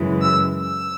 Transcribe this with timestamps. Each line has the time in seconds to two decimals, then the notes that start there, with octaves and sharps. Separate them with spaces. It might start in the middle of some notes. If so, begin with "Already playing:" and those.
Already playing: F#2 C#3 E3 G#3
0.21 E6
0.62 E6